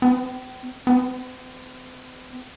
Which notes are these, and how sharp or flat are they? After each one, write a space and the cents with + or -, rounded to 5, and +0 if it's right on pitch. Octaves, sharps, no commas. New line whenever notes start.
C4 -40
C4 -45